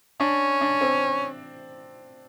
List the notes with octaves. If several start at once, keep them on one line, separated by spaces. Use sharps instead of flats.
C#4 D4
D4
C4